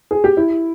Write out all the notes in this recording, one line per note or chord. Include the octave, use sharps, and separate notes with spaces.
G#4
G4
E4